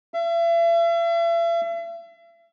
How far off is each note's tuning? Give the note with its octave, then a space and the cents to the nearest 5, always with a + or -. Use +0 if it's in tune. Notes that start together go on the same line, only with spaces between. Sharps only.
E5 +40